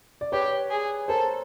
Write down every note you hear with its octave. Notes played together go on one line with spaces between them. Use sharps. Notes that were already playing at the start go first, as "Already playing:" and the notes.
D5
G4 B4 C#5
G#4
A4 A#4 C5